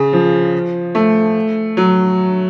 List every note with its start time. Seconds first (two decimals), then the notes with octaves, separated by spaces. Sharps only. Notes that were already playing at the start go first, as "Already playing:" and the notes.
Already playing: C#3
0.13 F3
0.95 A3
1.77 F#3